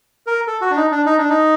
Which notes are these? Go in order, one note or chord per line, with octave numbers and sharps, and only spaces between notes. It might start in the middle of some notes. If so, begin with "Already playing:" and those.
A#4
A4
F#4
D4
D#4
D4
D#4
D4
D#4